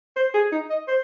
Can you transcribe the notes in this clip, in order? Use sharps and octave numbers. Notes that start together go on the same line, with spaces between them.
C5
G#4
D#4
D#5
C5